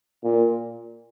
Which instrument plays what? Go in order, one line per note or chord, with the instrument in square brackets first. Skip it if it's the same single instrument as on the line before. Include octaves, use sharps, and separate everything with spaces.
[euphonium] A#2